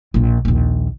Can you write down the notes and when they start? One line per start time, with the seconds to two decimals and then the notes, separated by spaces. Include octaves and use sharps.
0.14 A#1 F4
0.45 A#1 D#2